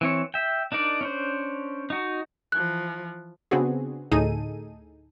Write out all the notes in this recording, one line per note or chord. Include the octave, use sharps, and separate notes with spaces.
E3 C4 C#5
E5 G5
D4 D#4 A#4 D5
C#4 D4 C5
D#4 F#4
E3 F3 F#6
C#3 B3 C4 D4 F#4 G#4
D2 A2 D#4 G#4 A4 D#7